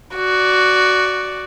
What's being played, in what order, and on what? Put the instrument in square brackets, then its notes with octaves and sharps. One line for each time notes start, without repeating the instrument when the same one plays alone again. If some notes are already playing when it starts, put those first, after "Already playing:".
[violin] F#4 D5